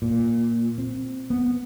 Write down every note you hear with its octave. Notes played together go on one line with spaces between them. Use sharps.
A#2
C4
B3